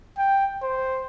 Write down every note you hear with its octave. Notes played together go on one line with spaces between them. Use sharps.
G5
C5